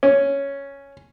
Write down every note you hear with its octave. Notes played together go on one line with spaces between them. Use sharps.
C#4